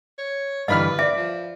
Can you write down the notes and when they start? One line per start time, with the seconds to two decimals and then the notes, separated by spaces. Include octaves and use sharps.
0.18 C#5
0.68 G2 D3 E3 B4 D#5 F5 B5 F6
0.99 D5 E5
1.16 F3